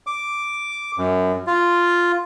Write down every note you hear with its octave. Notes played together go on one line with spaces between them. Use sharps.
D6
F#2
F4